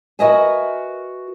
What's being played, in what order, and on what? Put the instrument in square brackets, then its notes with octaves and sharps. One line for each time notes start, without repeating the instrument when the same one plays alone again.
[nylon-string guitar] F#4 A#4 B4 D#5 E5 G#5